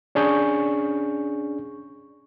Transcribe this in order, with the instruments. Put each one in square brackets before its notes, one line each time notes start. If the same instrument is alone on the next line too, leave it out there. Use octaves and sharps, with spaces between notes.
[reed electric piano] C#4 D4 G#4 C#6 G6